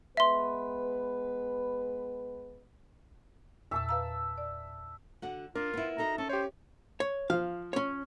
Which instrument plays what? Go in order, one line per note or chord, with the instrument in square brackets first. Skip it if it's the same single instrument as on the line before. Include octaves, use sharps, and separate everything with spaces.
[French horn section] G#3 B3 B4 [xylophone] E5 C6
[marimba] E2 A#2 [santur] E5 A5 E6
[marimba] B4 F5 A#5
D5
[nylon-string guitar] D3 F#4 F#5
[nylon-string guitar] D4 [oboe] F4 [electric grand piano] A#4
[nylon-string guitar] B3 E4
[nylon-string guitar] D#4 F#4 A4 [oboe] A#5
[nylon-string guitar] C#4 [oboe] A4
[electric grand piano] G4 C#5 [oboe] C5
[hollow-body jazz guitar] C#5
[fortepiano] F3 [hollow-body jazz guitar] F5
[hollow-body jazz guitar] C#4 C#5